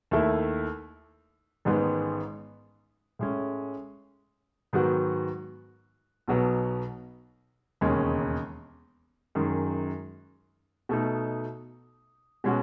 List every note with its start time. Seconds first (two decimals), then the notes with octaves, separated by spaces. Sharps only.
0.11 D#2 D#3 A3 E4
1.65 A1 G#2 D#3 G#3 B3
3.19 A2 G#3 C#4
4.73 G#2 D#3 F#3 B3 F#4
6.28 B1 B2 F#3 B3
7.81 E1 D#2 C#3 G#3 C#4
9.35 F#2 D#3 G#3
10.89 B2 A3 D#4
12.44 B2 G#3 C#4 F#4